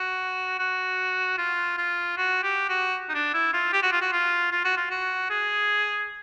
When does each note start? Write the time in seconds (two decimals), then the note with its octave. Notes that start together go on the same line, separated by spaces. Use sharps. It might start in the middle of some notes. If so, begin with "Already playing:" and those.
Already playing: F#4
0.59 F#4
1.38 F4
1.78 F4
2.17 F#4
2.43 G4
2.69 F#4
3.09 D#4
3.15 D4
3.34 E4
3.54 F4
3.73 G4
3.83 F#4
3.92 F4
4.01 F#4
4.13 F4
4.52 F4
4.64 F#4
4.78 F4
4.91 F#4
5.30 G#4